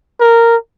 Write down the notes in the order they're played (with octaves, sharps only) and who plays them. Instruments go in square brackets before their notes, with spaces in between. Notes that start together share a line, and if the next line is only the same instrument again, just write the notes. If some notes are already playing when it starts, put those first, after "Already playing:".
[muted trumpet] A#4